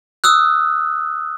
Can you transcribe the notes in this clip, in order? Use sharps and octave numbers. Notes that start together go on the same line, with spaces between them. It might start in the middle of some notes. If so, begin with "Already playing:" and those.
D#6 E6 F#6